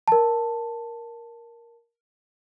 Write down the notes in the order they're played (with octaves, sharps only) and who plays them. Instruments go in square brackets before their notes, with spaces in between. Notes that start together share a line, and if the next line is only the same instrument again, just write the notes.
[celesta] A#4 A5